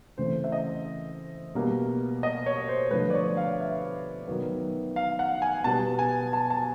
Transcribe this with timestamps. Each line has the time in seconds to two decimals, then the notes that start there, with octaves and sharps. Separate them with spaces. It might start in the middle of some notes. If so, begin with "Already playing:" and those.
0.18 C#3 E3 A3 C4 C5
0.44 E5
0.52 D#5
1.55 B2 G3 A#3
2.23 D#5
2.46 C#5
2.69 C5
2.91 D3 F3 A3 B4
3.10 D5
3.15 C#5
3.37 F5
3.60 E5
4.28 D#3 F#3 B3
4.96 F5
5.19 F#5
5.42 G#5
5.64 B2 G3 B3 A5
5.99 G#5
6.33 A5
6.50 A5